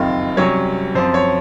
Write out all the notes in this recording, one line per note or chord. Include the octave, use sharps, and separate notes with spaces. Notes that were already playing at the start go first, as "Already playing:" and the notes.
Already playing: F#1 F2 D#3 F4
C2 C3 F#3 C#4 C#5
F#2 F3 C4 C5
C#5